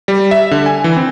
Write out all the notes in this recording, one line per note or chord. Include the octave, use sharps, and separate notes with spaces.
G3
E5
D3
G#5
E3
C4